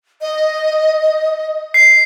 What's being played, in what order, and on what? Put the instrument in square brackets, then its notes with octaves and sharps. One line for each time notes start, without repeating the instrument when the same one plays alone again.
[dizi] D#5
[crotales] C7